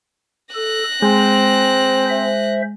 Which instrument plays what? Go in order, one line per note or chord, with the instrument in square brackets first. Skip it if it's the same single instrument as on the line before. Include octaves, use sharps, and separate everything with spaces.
[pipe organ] A4 [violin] F#6 A#6
[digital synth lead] G#3 [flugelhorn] C4 [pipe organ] C5
[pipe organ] C5 E5